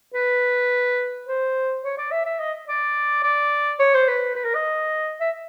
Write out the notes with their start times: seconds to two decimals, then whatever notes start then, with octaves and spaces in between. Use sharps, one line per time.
0.14 B4
1.27 C5
1.84 C#5
1.98 D5
2.11 E5
2.26 E5
2.40 D#5
2.68 D5
3.23 D5
3.79 C#5
3.94 C5
4.08 B4
4.36 B4
4.45 A#4
4.55 D#5
5.20 E5